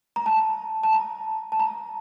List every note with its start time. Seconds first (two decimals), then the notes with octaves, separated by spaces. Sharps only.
0.16 A#5
0.26 A5
0.83 A5
0.93 A#5
1.52 A5
1.60 A#5